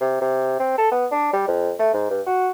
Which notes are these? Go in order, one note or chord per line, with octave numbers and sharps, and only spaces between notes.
C3
C3
C4
A4
B3
D4
G3
F2
A3
G#2
G2
F#4